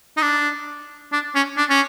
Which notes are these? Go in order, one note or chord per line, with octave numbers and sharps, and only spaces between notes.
D#4
D4
D4
C#4
D4
C#4